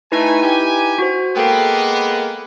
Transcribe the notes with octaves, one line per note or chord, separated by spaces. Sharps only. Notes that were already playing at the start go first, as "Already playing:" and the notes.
A3 D#4 E4 B4 G#5
G4 G#5
F#4 C5
G#3 A#3 B3 A4 G5